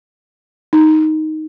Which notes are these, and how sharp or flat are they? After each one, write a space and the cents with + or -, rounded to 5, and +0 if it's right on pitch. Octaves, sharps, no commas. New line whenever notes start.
D#4 +5